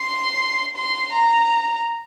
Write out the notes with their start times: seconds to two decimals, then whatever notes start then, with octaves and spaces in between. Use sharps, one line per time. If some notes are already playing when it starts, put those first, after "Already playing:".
Already playing: C6
0.77 C6
1.13 A#5